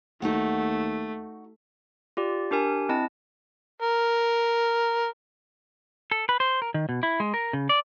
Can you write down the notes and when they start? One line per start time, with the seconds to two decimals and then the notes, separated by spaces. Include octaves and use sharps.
0.22 D#2 A3 D#4 F#4 F#5
2.17 F4 G4 D5
2.51 D4 G4 A#4 G#5
2.89 C4 E4 D#5 A5
3.82 A#4
6.11 A4
6.29 B4
6.40 C5
6.62 A#4
6.74 D#3
6.89 B2
7.03 E4
7.20 G#3
7.34 A#4
7.53 C#3
7.69 D5